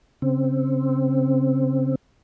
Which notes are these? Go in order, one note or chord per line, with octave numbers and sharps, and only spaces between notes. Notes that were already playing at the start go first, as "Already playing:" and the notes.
C#3 C4